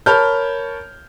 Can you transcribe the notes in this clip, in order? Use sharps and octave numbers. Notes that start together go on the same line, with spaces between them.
A#4 C#5 A5 B5 F6 G6